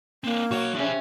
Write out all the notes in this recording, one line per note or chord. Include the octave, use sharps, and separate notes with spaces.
A#3 C4 D4
B1 F#4 C#5
C3 C#4 D4 G#4